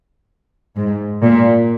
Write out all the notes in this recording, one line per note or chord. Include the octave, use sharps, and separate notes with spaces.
G#2
A#2